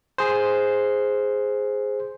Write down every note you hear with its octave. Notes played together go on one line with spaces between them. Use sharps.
G#4 C5